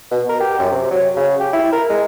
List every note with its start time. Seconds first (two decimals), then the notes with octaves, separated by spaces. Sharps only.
0.11 B2
0.29 A#4
0.40 G4
0.59 F#2
0.72 C3
0.91 F#3
1.16 C#3
1.40 G4
1.53 E4
1.72 A#4
1.89 G#3